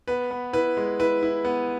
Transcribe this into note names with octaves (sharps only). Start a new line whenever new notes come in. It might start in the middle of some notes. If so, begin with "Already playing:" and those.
B3 B4
B3
E4 B4
G#3
E4 B4
E4
B3